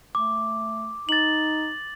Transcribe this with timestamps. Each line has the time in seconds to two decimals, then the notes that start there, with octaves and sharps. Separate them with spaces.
0.15 A3 D6
1.09 D#4 A6 F#7